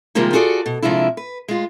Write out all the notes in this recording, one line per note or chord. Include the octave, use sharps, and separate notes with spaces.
C3 D#3 F3 G3 G#3 A#3
F4 F#4 G#4 A4 D5
B2
C3 F3 G#3 D4 E4
B4
G#3 F4